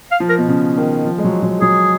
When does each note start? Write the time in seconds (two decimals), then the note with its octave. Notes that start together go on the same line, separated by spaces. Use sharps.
0.11 F5
0.20 F3
0.29 A#4
0.38 B2
0.48 C#3
0.77 D#3
1.05 F3
1.18 G#3
1.24 F#3
1.43 F#3
1.61 F#3 G#4